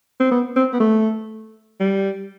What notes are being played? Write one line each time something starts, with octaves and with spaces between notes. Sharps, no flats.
C4
B3
C4
B3
A3
G3